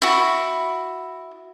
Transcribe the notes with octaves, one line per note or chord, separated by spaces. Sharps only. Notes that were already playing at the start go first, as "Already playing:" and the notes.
E4 F#4